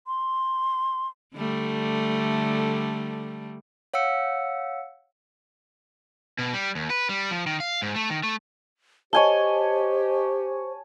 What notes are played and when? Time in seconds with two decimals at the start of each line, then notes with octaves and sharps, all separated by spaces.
0.07 C6
1.35 D3 G3 A3
3.94 C#5 F5 F#5 E6 C#7
6.39 B2
6.53 G3
6.75 D#2
6.90 B4
7.09 G3
7.31 F3
7.46 D#3
7.60 F5
7.82 G#2
7.96 A3
8.10 D#3
8.24 A3
9.13 G4 C5 C#5 D#5 G#5 A5 G7